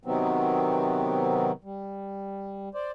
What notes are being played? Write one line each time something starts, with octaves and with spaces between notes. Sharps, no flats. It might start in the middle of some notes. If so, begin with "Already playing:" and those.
C3 D#3 F#3 B3 C4
G3
C5 D5